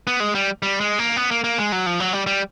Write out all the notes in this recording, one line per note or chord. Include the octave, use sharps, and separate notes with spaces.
B3
G#3
G3
G3
G#3
A#3
B3
A#3
A#3
G#3
F#3
F3
F#3
G3
G3